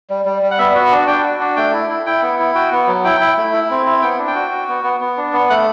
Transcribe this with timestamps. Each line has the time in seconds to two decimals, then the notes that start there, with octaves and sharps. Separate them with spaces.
0.10 G3
0.25 G3
0.43 G3
0.51 F#5
0.59 B3 E5
0.75 F#4
0.91 D4
1.07 D4 G5
1.24 F#4
1.40 D4
1.56 A3 G5
1.73 E4
1.90 E4
2.06 E4 G5
2.22 B3
2.39 E4
2.55 F#4 G5
2.72 B3
2.87 F#3
3.04 E4 G5
3.21 E4
3.38 A3
3.53 E4
3.70 C4
3.86 E4
4.02 B3 G5
4.19 D4
4.27 G5
4.35 F#4
4.51 F#4
4.69 B3
4.84 B3
5.00 B3
5.17 D4
5.33 B3
5.50 A3 F#5